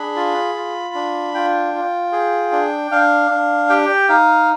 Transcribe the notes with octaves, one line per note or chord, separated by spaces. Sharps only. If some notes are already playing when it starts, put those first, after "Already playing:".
Already playing: D4 G#4 B5
F4
F4
D4
F4 G5
F4
G#4
D4
D4 F5
D4
G4 G5
D#4 F5